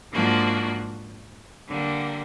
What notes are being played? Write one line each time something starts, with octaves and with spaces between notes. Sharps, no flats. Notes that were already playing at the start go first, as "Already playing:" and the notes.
G#2 F3 A#3 D4 F#4
D3 G3 A#3